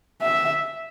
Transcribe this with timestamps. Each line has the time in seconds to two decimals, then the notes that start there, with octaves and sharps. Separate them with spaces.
0.22 E5